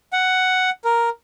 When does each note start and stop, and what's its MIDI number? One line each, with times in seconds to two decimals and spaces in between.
0.13 0.70 78
0.85 1.09 70